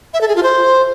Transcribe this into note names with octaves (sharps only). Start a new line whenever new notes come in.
E5
A4
G#4
F4
C5